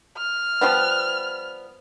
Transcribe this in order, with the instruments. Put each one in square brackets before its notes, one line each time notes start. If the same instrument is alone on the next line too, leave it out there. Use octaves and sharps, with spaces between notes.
[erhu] F6
[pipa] F3 G3 B3